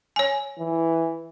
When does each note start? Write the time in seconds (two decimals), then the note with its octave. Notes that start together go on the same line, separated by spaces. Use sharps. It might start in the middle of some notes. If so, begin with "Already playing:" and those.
0.16 C#5 G#5
0.58 E3